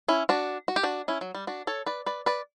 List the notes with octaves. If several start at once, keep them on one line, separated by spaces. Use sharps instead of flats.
C#4 E4
D4 F#4
F#4
G4
D4 F#4
C#4 E4
F#3
G3
D4 F#4
A4 C#5
B4 D5
B4 D5
B4 D5